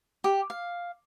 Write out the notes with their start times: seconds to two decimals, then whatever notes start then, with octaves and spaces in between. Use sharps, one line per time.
0.24 G4
0.50 F5